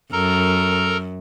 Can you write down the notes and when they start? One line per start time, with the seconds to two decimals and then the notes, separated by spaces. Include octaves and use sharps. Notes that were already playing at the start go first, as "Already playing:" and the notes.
0.12 F#2 A4 A#4 A#5